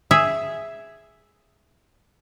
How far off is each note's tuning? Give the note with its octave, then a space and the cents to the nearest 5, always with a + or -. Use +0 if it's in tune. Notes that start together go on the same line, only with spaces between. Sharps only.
G#4 +0 E5 +0